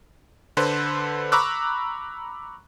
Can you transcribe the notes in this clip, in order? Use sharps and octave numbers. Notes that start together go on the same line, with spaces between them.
D3 A4 B4 C5
A#5 B5 C#6 D6 E6 F#6